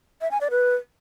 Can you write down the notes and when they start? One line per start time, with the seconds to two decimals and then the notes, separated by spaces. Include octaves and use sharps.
0.21 E5
0.31 G#5
0.41 D5
0.51 B4